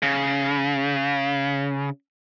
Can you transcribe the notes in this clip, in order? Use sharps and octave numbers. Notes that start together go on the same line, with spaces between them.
C#3